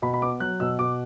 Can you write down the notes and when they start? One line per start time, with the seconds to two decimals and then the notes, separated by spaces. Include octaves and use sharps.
0.02 B2 B5
0.14 B5
0.22 B3 D6
0.40 F#3 F#6
0.60 B2 E6
0.79 B2 D6